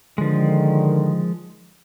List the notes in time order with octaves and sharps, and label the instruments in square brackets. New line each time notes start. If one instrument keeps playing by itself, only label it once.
[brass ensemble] D3 D#3 [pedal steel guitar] F3 G#3